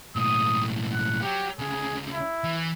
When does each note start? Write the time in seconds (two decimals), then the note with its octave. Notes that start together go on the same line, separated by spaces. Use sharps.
0.16 B1 A2 D#6
0.92 F#5
1.22 F#3 G4
1.59 D2 C#3 G#4
2.12 E4
2.44 E3